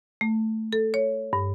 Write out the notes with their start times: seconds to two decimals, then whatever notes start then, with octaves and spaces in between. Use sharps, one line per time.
0.21 A3
0.73 A4
0.94 C#5
1.33 G2